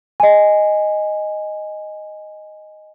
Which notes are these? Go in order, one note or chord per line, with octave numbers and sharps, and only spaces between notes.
D#5 G#5